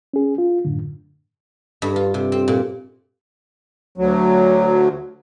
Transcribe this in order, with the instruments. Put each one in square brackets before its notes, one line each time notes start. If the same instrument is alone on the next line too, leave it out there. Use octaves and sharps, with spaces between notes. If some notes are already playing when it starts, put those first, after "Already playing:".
[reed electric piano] C#4 G#4
F4
F#2 A2 D3
[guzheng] G2
F4
C3
C4
A#2
[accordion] D2 F#3